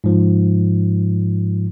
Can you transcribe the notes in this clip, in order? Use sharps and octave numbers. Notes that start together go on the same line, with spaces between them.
G#2 F3